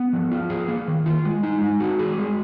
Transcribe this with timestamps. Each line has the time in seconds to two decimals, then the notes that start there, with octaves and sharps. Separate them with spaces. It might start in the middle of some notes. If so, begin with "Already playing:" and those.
Already playing: B3
0.13 F3
0.32 F4
0.50 G#4
0.68 A#3
0.88 D#3
1.06 F4
1.25 G#3
1.43 D#4
1.62 G#3
1.80 F#4
1.99 G#4
2.18 G#3